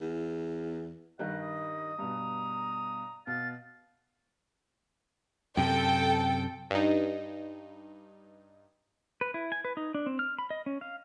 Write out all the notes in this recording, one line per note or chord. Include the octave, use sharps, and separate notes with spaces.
E2
G2 D#3 G3 D#5 F#5
D#6
G2 B2 A#5
B2 F5 A6
F#2 C3 A4 G5
G2 D#4
B4
E4
G#5
B4
D#4
D4
C4
F6
B5
D#5
C#4
F5